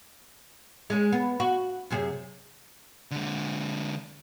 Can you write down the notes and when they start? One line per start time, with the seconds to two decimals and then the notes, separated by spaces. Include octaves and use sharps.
0.90 G#3 C#4
1.12 B3
1.40 F#4
1.90 F#2 C3 G#4
3.11 D3 G#3